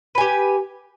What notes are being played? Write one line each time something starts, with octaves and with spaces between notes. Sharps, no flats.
G4 B4 G#5